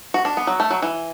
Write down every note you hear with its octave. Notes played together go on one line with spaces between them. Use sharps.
F#4
D4
B3
F#3
A3
F#3
E3